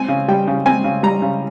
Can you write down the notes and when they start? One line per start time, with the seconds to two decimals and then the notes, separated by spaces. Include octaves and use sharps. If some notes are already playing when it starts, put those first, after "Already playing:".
Already playing: C4 G#5
0.09 C#3
0.28 G3 G5
0.48 C#3
0.66 C4 G#5
0.84 C#3
1.03 G3 A#5
1.22 C#3